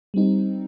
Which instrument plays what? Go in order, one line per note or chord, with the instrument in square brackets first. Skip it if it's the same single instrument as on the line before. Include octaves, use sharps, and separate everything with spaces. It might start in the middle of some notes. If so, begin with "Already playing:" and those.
[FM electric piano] G3 C4 D#4